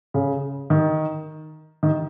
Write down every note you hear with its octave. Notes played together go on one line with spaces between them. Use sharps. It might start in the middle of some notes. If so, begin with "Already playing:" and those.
C#3
D#3
D#3